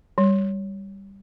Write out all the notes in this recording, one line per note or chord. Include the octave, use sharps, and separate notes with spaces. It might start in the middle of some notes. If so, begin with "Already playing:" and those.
G3